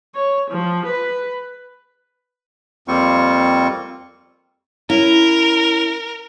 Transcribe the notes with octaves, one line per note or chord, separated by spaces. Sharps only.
C#5
F3
B4
F2 G3 A#3 C4 F4 C#6
C#4 E4 A#4